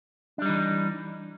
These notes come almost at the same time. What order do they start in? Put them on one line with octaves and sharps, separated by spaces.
D4 G3 D#4 E3